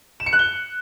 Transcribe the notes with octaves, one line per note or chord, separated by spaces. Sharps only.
E7
C#7
F#6
G7